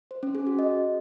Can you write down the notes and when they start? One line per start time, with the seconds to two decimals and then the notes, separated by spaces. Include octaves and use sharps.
0.11 C5
0.23 C#4
0.35 G#4
0.47 F#4
0.59 D#5